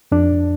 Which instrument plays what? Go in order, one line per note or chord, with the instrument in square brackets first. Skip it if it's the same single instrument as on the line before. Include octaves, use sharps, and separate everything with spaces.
[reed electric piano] F2 D4